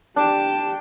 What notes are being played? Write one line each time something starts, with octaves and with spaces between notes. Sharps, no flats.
D4 G4 G5 A5